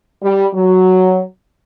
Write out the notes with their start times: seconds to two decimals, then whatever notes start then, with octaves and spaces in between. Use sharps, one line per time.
0.23 G3
0.54 F#3